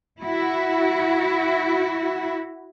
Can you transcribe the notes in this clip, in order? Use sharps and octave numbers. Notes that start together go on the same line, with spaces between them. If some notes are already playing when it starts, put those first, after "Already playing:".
E4 F#4